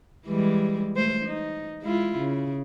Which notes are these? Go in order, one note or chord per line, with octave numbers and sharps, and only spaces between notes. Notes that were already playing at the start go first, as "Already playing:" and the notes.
E3 G3 G#3
A3 C5
D#4
G#3 E4 F4
C#3